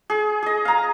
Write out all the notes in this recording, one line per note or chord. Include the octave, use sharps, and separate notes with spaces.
G#4
G#4 D#5
F5 A#5